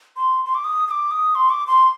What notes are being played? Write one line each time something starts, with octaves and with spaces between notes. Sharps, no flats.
C6
C6
D6
D#6
D#6
D6
D#6
C6
D6
C6